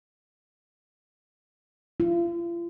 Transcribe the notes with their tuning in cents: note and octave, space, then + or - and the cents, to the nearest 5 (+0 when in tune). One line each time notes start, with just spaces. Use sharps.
F4 -40